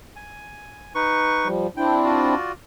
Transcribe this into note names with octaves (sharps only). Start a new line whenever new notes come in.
G#5
D#4 B4 C#6
F3 G3
C4 D4 E4 G5
F4 F#4 D5